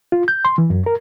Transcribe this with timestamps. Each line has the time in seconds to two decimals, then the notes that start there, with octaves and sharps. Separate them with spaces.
0.12 F4
0.28 G6
0.45 C6
0.58 E3
0.70 F#2
0.86 A#4